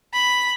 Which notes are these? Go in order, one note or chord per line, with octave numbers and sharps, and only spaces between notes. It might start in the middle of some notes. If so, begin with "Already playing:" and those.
B5